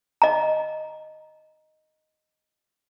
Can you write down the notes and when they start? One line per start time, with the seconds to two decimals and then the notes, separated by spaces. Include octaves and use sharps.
0.22 D#5 A#5